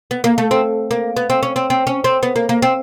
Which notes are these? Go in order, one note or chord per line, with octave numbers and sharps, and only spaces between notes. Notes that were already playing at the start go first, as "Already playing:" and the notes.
B3
A#3
A3
C4
A#3
B3
C4
C#4
C4
C4
C#4
C4
B3
A#3
A#3
C4